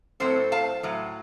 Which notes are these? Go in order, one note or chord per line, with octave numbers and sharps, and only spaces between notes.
A2 F#3 C4 A4 C5
F5 A5
A2 F#3